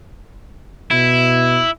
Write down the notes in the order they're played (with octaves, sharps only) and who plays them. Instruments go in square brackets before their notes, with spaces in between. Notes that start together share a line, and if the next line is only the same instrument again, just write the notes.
[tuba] B2 [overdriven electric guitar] E4